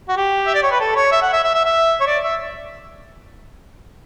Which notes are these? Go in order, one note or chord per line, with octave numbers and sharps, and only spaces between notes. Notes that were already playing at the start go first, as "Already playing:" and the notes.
F#4
G4
E5
D5
C#5
B4
A4
C#5
E5
F#5
E5
E5
E5
E5
C#5
D5
E5